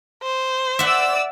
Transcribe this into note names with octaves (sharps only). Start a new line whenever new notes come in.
C5
D5 E5 F#5 E6